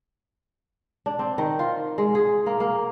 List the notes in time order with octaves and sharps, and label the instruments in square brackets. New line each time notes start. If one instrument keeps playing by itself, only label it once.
[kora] D4
C4
D#3
F4
G#3
G#4
A#3
A#3